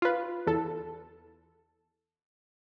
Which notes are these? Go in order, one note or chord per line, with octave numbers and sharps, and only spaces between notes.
F4 B4
E2 A4